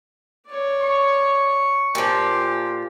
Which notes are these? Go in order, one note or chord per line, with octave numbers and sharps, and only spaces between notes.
C#5 D5
C#6
A#2 F3 G4 C6